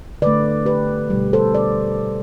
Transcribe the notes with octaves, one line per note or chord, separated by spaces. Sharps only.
D3 A3 B4 D5
G4 B4
B2 G3
A4 C5
D5